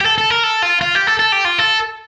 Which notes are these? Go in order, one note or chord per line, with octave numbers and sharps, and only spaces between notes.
G4
A4
A4
A#4
A4
F4
F4
G4
A4
A4
G4
F4
A4